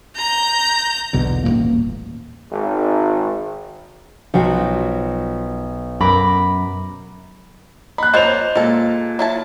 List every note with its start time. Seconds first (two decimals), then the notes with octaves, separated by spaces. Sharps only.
0.16 A#5 G6
1.13 B1 E2 B2 D3
1.44 D#1 A1 G#2 A#3
2.51 G#1
4.34 B1 F3 F#4
6.01 F#2 A#4 B5 D6 A#6
7.98 D#4 B5 F#6
8.14 F3 A#3 C4 C5 C#5 D#5 F7
8.55 A#2 G#3 A4
9.19 F#3 E4 A5